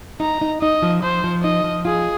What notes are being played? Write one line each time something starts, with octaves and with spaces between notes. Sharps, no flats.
D#4 A#5
D#4
D#4 D#5
F3
F3 C5
F3
D#4 D#5
F3
F4 G#4